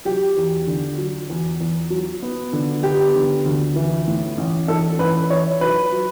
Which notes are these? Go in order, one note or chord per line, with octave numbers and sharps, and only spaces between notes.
F#3 G4
E2
D3
F#3
E2
E2
F#3
B3
D3
B3 G4
D3
D2
E3
A2
A1
A1 A4
A1 B4
E3 C#5
F#3 B4
F#3